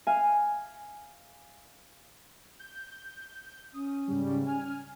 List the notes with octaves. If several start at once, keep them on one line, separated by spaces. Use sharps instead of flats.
F5 G#5
G6
C#4 D#6
G#2 C#3 G3
G#5 F6